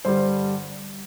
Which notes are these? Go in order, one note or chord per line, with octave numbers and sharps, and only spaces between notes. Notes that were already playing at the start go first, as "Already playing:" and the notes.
G2 D3 G3 C5